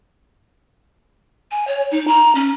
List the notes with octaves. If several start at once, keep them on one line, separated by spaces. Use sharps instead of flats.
G#5
C#5
D#4
A#5
C#4